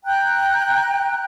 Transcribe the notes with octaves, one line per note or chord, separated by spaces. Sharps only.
G5 A#5 F#6